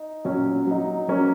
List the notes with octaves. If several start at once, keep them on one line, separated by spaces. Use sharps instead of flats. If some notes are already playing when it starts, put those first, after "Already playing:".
Already playing: D#4
A#2 F#3 C#4
F#3 D#4
F#3 A#3 C#4